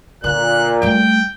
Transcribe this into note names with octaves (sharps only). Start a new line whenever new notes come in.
A#2 D3 F#6
G3 A3 G5